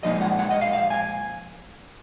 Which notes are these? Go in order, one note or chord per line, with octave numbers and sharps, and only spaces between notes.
A#2 F3 G#3 D#4 D#5
F#5
F#5
D#5
F5
F5
G#5